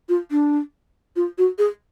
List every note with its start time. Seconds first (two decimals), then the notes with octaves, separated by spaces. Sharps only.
0.09 F4
0.31 D4
1.16 F4
1.38 F#4
1.58 G#4